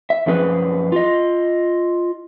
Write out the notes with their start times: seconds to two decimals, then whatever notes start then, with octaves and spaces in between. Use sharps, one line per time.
0.10 E5
0.26 F#2 F3 C#4 G#4 B4
0.92 F4 D#5